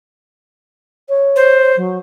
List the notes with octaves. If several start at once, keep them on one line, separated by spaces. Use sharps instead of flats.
C#5
C5
F#3